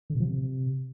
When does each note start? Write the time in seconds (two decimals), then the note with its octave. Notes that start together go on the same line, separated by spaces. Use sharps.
0.10 D3
0.15 B2
0.20 F3
0.25 C3